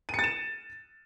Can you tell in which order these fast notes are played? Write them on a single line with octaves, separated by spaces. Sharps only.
D#7 C#7 A6 E7